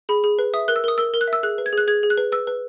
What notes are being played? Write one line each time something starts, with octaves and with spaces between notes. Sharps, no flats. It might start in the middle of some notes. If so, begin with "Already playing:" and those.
G#4 B5
G#4
B4
E5 D#6
A#4 F#6
E6
A#4 D#6
A#4 E6
A#4
F#6
E5
E6
G#4 F#6
B4
G#6
G#4
F#6
G#4 G#6
G#4
F#6
B4
B4 E6
B4